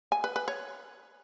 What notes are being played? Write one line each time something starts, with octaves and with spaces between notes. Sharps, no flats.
G#5
B4
B4
C#5